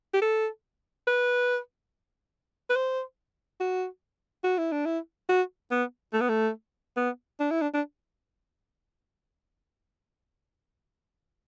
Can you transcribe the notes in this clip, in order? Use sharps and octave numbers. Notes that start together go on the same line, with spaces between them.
G4
A4
B4
B4
C5
F#4
F#4
E4
D4
E4
F#4
B3
A3
B3
A3
B3
D4
E4
D4
D4